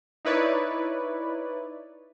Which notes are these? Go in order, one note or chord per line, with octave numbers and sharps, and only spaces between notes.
D#4 E4 B4 C#5 D5